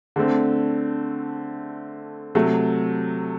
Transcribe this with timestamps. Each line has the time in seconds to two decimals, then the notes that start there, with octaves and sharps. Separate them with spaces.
0.16 D3 A3 C4
2.35 C3 F#3 A3